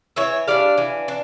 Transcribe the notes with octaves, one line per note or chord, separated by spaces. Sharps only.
E3 C#5 E5
G3 D4 D5 F5
E3
D4